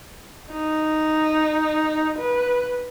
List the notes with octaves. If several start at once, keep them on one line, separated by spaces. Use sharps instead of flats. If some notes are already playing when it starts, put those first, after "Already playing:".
D#4
B4